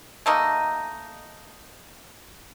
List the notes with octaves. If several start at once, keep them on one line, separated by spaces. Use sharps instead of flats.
A3 A#3 D#4